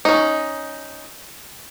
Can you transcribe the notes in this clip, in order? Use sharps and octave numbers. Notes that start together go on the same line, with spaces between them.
C#4 D#4